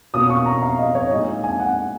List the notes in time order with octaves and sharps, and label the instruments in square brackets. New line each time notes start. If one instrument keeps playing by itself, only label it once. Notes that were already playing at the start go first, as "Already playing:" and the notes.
[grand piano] B2 A#3 C#4 F4 [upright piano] D#6
[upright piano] C#6
A#5
F5
D#5
C#5
[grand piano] A#2 G#3 D#4 [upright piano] D#5
[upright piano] G#5
F#5